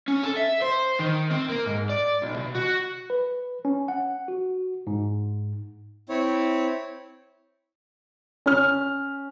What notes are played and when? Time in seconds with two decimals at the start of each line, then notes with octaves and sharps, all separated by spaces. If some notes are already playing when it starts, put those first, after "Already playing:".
0.08 C#4
0.23 A4
0.36 E5
0.61 C5
0.99 D#3
1.30 C4
1.49 A#3
1.66 G#2
1.90 D5
2.22 B1
2.36 B2
2.55 F#4
3.10 B4
3.65 C#4
3.88 F#5
4.28 F#4
4.87 G#2
6.09 C4 E4 C#5
8.46 C#4 F6